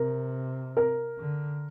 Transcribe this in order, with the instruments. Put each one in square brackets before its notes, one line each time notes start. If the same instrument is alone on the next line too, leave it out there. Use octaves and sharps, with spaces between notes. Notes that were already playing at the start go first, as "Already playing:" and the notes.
Already playing: [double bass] C3 [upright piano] A#4
[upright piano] A#4
[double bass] D3